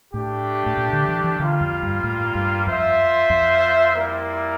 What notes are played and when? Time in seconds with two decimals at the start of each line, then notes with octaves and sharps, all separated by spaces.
0.14 A2 A3 D4 G4
0.66 A2
0.77 A#2
0.93 D3
1.08 E3
1.24 E3
1.40 D3 G3 A#3 F4
1.61 F2
1.83 G2
2.04 A2
2.35 G2
2.67 F2 F4 C5 E5
3.30 F2
3.93 G3 A#3 E4 A#4 D5